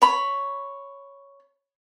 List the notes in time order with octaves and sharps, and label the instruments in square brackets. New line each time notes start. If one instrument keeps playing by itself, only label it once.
[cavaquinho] C#5 B5